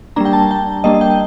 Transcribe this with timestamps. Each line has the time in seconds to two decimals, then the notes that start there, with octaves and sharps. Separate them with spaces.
0.16 G3 A#3 D4 A#5
0.25 G5
0.33 A5
0.51 G5
0.84 G3 A#3 D4 D#5
1.01 G5